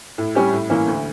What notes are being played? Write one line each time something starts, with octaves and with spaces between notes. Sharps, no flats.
A2
G3 C#4 G4
A2
E3 A#3 C#4
D2